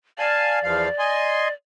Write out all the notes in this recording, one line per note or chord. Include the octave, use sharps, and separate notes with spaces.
D5 F5 G#5 A5
E2 F3 F5
D#5 G#5 C6